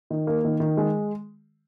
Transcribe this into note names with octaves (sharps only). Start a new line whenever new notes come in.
D#3
A#3
D#3
D#3
G#3